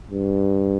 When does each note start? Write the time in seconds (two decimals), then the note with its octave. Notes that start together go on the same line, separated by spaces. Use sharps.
0.11 G2